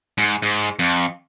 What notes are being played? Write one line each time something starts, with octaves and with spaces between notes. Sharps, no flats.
G#2
G#2
F2